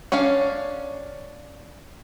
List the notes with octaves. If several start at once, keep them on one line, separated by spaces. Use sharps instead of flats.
C#4 D4 C#5 F5